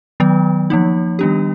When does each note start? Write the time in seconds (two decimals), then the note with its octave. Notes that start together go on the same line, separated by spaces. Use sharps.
0.20 D#3 F#3 B3
0.70 F3 A#3 D#4
1.19 D#3 G3 B3 D4 G4